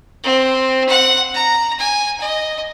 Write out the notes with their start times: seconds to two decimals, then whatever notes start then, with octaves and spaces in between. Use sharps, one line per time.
0.23 C4
0.89 F#5
1.34 A#5
1.79 G#5
2.20 D#5